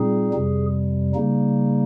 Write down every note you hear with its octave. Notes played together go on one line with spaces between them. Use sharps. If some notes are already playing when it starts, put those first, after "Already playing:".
Already playing: A#2 G3 C4 D#4 G#4
F2 C3 G3
C#3 G3 A#3 D#4